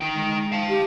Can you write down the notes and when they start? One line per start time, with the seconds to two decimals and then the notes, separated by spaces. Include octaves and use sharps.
0.01 D#4 G5
0.14 G#3
0.52 F5 A5
0.69 G4